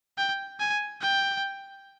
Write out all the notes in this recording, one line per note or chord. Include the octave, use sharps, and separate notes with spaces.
G5
G#5
G5